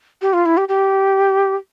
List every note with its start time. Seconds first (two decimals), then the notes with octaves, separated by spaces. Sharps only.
0.22 G4
0.33 F4
0.46 E4
0.57 G4
0.69 G4